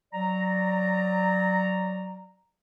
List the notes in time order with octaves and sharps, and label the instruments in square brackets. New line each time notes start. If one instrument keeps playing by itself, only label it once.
[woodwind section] F#3 D5 A#5